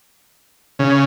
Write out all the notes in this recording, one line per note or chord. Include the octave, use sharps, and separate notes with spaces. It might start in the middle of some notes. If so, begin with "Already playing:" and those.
C#3